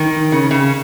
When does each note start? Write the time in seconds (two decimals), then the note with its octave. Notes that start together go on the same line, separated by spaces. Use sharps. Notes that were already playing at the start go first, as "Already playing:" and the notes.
Already playing: D#3
0.32 C#3
0.51 C#3